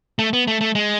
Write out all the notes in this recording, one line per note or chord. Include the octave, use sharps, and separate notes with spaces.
A3
B3
A3
A3
G#3